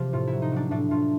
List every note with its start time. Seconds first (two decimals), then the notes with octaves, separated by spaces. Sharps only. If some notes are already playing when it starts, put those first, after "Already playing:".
Already playing: C3 F3 G4
0.13 A2 F4
0.27 F#3 E4
0.42 D#4
0.52 F#3 D4
0.71 A2 D4
0.91 A2 F4